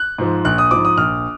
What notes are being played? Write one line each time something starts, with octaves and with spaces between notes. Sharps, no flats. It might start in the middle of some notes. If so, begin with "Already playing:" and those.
Already playing: F#6
G#2 F3
A#1 F#6
D#6
G#2 F3 D6
D#6
A#1 F6